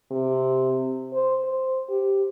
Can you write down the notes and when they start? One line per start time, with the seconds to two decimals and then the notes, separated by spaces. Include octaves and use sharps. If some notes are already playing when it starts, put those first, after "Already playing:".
0.11 C3
1.13 C5
1.44 C5
1.89 G4